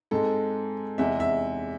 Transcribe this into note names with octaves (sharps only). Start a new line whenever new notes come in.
G#2 G#3 C4 A4
E2 C3 G#3 E5
E5